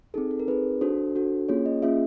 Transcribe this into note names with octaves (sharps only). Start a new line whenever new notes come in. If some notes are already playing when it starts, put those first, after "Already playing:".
C4 D#4 G#4 A4
A4
A#4
C4 D#4 G#4 B4
D4 F#4 A4 C5
D4 F#4 A4
A#3 C#4 F4 G#4 C#5
D#5
A#3 C#4 F4 G#4 E5